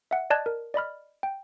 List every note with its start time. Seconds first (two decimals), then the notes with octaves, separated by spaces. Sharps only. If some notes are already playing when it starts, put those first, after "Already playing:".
0.11 E5 F#5
0.30 D5 D#5 A5 F#6 G#6
0.46 A#4
0.74 D5 D#5 B5 F6
1.23 G5